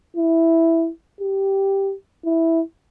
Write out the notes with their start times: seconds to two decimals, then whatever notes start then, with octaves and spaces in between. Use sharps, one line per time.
0.16 E4
1.21 G4
2.25 E4